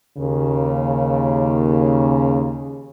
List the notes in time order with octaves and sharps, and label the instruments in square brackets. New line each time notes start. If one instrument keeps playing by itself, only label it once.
[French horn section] D#2 C#3